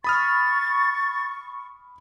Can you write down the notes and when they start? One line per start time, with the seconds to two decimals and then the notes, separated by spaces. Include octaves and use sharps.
0.04 B5 C#6 D#6 F6 A6